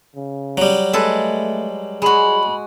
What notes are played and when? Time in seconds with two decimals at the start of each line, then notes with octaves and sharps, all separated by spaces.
0.16 C#3
0.57 F#3 G3
0.93 G#3 A3 A4 B4
2.02 G#3 F#4 G#4 B5